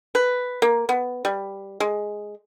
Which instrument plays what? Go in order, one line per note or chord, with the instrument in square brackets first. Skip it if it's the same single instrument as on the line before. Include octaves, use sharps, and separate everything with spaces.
[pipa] B4
A#3
B3
G3
G#3